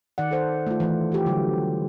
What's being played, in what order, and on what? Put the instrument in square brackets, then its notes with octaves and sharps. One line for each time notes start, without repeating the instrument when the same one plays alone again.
[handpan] D#3 D5 F#5
A4 C5 F#5
A3 F4
E3 A3
F4 G4
D3 F#3 G3